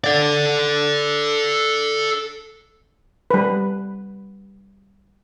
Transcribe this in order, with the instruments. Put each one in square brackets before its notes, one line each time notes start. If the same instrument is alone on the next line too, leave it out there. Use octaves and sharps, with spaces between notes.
[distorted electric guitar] A4 D5
[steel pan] G3 B4